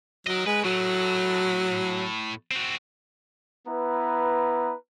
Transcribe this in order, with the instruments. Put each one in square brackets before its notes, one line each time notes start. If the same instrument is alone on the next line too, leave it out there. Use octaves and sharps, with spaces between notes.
[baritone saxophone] F#3 [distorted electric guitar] A#4 D#5
[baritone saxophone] G#3 [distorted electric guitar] B4
[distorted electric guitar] A2 A3 [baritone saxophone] F#3
[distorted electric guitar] C4 F#4
[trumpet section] B3 E4 B4 A#5